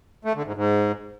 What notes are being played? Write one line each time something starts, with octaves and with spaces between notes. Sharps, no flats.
A3
D3
G#2
G#2